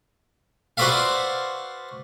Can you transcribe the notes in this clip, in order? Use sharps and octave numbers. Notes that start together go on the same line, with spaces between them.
F#4 B4 C5 D5 E5 F5